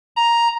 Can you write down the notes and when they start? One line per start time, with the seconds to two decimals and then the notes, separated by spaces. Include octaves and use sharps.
0.16 A#5